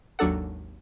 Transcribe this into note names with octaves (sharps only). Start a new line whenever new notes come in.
G#1 D#2 F#3 D4 A4 F#5